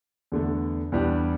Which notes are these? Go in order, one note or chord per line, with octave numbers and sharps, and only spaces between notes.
E2 D3 A3
E2 E3 G3 D4 G4